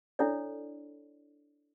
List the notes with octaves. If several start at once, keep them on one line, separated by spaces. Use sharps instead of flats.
D4 E4 A4 C#5 D5